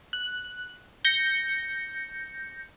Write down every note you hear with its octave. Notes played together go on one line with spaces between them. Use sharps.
F#6
G6 A#6 C#7